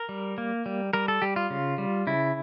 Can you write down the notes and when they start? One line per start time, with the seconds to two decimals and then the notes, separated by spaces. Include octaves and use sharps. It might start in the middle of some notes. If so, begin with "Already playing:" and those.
Already playing: A#4
0.09 G3
0.38 A#3
0.66 G3
0.93 G3 A#4
1.08 A4
1.22 G3 G4
1.36 F4
1.50 C#3
1.78 G3
2.07 C#3 E4